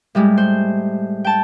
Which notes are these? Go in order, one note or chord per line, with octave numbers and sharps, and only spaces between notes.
A2 G3 G#3
C5
G5 A5